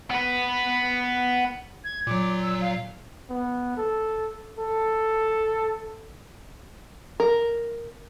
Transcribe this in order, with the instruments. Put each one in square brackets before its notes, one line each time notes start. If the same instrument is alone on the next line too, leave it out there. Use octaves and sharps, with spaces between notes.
[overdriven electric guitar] B3 B4
[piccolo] G#6
[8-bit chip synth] A#2 F#3 [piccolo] D6
[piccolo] E6
F5
[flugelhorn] B3
A4
A4
[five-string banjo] A#4